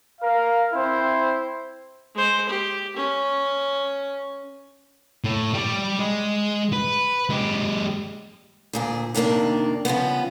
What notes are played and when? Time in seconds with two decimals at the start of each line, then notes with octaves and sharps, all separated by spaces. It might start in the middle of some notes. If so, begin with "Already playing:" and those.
0.21 A#4 F5
0.73 C4 E4 C5
2.15 G#3 C5
2.49 G4
2.96 C#4
5.24 A2
5.54 G3 D5
5.99 G#3
6.73 B4
7.30 G#3 G4
8.73 D2 A#2 G#4
9.15 F2 C3 D#3 A#3 D4
9.85 C#3 F3 G3 B3